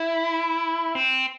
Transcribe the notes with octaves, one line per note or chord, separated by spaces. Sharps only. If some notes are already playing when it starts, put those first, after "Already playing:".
Already playing: E4
C4